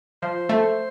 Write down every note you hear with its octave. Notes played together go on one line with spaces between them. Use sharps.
F3 C5
A3